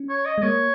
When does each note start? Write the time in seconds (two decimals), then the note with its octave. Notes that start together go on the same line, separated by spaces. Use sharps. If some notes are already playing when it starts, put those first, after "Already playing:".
Already playing: C#4
0.10 C#5
0.26 D#5
0.38 G#3
0.43 A#3 C#5